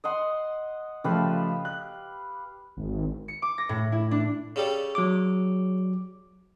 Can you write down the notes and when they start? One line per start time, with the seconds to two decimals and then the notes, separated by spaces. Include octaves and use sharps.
0.04 D#5 F#5 C6
1.04 C#3 F3 A3 G4 B4 F5
1.65 F#6
2.77 G#1
3.28 C#7
3.42 D6
3.58 A#6
3.69 A2
3.92 E4
4.11 D4
4.56 C#3 G3 A4
4.95 F#3 D6